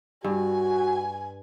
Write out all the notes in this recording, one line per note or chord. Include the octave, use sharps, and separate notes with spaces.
G2 F#4 G#5